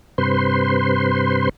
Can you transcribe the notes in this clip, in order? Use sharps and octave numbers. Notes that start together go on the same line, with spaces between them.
G2 C3 B4 C5 C6